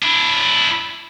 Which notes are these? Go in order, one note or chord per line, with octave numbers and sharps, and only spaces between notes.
D4 E4